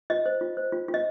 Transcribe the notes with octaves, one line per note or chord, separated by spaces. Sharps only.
F4 D#5
C5
F4
C5
F4
F4
D#5